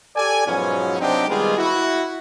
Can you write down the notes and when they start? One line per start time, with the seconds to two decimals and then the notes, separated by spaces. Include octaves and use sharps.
0.16 G4 A4 D5 G#5
0.46 G#2 B2 F3 F#3 C#4
1.00 C3 F#3 C4 D4 D#4 G4
1.28 D#3 G3 G#3 B3 F4 G#4
1.57 E4 F#4